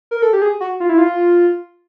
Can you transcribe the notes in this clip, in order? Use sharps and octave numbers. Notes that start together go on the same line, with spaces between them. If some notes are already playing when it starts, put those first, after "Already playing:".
A#4
A4
G4
G#4
F#4
F4
E4
F4